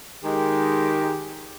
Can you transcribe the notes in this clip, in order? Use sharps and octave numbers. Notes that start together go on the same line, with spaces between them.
D#3 G#3 G4